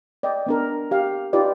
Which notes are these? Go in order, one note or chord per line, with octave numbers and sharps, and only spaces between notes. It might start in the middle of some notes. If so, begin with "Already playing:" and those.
D5 D#5 G5
B3 D4 A#4
G4 F5
D#4 F4 G4 B4 D5 D#5